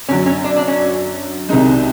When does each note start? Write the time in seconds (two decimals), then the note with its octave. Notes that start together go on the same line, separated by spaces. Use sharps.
0.09 F#2 D3 F#3 C#4
0.26 C#4
0.44 D4
0.56 D4
0.68 C#4
1.49 C2 C3 D#3 G#3 D#4